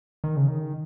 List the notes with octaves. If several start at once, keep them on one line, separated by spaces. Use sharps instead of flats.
D#3
C#3
D#3